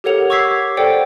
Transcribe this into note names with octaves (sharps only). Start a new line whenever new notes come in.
G4 A4 A#4 C#5 F#5 F7
C#6 D6 E6 G#6 B6 C7
A4 C5 D5 F#5 G5